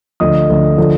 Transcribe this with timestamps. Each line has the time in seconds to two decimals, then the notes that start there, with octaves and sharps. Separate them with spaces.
0.20 D2 D3 F3 D#5 D#6
0.50 D2 D3 F3
0.78 D3 F3